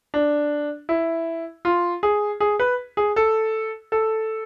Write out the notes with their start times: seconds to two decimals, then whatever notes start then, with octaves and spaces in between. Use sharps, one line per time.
0.14 D4
0.89 E4
1.65 F4
2.03 G#4
2.40 G#4
2.60 B4
2.97 G#4
3.16 A4
3.92 A4